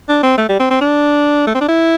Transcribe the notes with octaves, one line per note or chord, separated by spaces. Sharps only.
D4
C4
A3
G3
C4
C4
D4
A3
C4
D4
E4